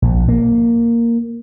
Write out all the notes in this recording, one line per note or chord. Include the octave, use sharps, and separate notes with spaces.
A#1
A#3